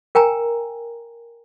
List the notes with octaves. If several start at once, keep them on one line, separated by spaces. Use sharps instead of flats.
A#4 G5 G#5 A#5